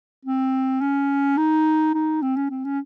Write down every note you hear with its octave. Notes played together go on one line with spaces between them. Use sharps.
C4
C#4
D#4
D#4
C4
C#4
C4
C#4